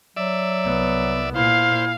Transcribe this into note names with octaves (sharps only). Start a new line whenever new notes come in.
F#3 D5 E5
C2 B3
A#2 E4 C5 F5